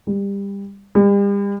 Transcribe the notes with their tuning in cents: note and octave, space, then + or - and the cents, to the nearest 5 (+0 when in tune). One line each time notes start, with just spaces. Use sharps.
G3 +25
G3 +40